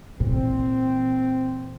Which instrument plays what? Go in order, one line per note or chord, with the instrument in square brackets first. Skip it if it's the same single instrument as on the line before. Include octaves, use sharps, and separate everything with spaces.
[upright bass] A#2 E3 [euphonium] C4